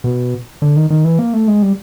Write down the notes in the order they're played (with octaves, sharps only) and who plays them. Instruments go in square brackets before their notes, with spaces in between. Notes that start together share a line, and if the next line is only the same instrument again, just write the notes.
[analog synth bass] B2
D3
D#3
D#3
E3
A#3
A3
G#3
G3